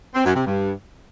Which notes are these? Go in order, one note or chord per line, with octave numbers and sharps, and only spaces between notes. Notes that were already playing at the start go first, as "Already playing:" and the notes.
C4
F#2
C3
G2